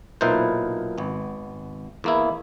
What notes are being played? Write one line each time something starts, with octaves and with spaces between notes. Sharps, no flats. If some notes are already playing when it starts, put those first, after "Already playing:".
B1 A#2 D#4 E4 B4 C5
G#1 B3
E2 A#3 E4